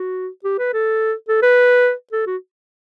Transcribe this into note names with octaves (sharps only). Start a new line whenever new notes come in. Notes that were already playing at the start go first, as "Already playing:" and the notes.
Already playing: F#4
G4
B4
A4
A4
B4
A4
F#4